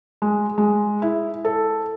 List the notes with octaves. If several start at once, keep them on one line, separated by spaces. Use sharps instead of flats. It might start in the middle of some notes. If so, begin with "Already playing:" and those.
G#3
G#3
E4
A4